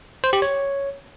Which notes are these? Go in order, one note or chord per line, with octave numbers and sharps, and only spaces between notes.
C5
G4
C#5